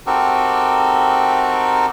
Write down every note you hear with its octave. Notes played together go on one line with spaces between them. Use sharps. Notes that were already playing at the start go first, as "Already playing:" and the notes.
C4 D#4 F#4 G4 A4 A#4